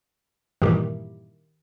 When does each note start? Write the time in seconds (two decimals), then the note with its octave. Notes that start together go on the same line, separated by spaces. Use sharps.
0.62 G2 A#2 D#3 E3 G4